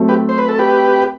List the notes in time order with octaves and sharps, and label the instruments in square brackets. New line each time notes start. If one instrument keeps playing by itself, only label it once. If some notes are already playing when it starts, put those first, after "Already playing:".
Already playing: [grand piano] F#3 A3 C4
[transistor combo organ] G4 B4
C5
B4
A4
G4 B4